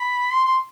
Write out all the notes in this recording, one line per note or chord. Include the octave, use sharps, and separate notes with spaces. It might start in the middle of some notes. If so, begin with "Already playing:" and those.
Already playing: B5
C6
C6